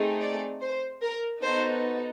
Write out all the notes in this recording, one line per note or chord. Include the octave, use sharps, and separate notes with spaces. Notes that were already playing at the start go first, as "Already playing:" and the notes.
Already playing: A3 C4 D#4 G#4
D5
C5
A#4
B3 D#4 F#4 A4 C5